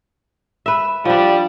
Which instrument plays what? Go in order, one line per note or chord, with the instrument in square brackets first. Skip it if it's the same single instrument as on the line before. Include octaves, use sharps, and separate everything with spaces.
[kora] B4 E5
[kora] F3 D4 [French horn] G3